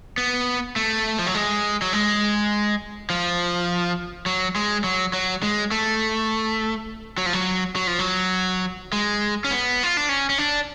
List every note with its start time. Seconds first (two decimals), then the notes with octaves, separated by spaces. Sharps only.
0.18 B3
0.76 A3
1.19 F3
1.26 F#3
1.35 G#3
1.82 F#3
1.93 G#3
3.10 F3
4.26 F#3
4.56 G#3
4.84 F#3
5.13 F#3
5.42 G#3
5.71 A3
7.18 F#3
7.26 F3
7.33 F#3
7.76 F#3
7.87 F3
7.99 F#3
8.93 G#3
9.44 C#4
9.50 B3
9.83 F4
9.97 D4
10.09 C#4
10.30 C#4
10.38 D4